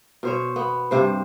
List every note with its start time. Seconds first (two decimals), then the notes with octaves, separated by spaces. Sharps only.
0.23 B2 C5 C#5
0.56 B3
0.91 G2 C3 C5